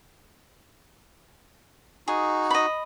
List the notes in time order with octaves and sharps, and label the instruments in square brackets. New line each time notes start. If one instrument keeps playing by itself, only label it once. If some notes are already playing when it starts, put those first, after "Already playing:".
[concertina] D#4 F#4 [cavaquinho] G#4
[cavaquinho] D#5 B5